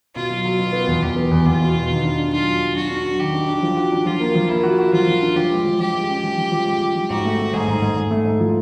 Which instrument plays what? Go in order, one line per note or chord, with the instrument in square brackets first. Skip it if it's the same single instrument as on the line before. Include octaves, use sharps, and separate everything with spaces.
[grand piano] B2 [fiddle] F4
[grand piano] F#3
F#3
B2
B3
E2
[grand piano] E2 [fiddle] G4
[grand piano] B3
E2
[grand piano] E2 [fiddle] F4
[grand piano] B2
B2
D#3
D4
D4
[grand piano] F#3 [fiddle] F4
[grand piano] F#3
F#3
[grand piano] D4 [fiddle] F#4
[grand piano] D4
F#3
[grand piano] D#3 [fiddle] G4
[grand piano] D4
D4
F3
F#4
D4
[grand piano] F3 [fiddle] F4
[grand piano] A#3
F3
[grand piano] A#3 [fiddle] E4
[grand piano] F#4
F#4
[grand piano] F3 [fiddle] F4
[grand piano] F3
D4
[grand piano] F3 [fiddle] G4
[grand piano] G#3
F3
[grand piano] F3 [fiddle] G4
[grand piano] G#3
C#4
F3
F3
F3
G#3
G#3
F3
[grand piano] G#2 [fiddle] F#4
[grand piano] A3
A3
[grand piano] G#2 [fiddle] G#4
[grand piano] G#2
G#2
G#2
A3
G#2
F3